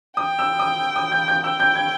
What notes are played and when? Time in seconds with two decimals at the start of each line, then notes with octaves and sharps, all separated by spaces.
0.17 G5 D#6
0.39 E6
0.59 D#6
0.96 D#6
1.12 G6
1.28 G6
1.44 G5 E6
1.60 G6
1.75 G#6